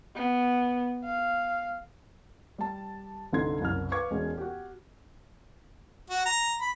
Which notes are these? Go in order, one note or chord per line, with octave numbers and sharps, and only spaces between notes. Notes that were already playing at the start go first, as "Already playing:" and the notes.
B3
F5
G3 A5
G1 C2 D3 D#4 C6 G#6
F#1 C2 F#2 F6
B4 F5 C#6 D6 G#6
E1 G#3 C#4
F#4 G4
F#4
A#5
B5